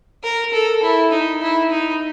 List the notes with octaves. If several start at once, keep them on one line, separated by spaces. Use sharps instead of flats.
A#4
A4
E4
D#4
E4
D#4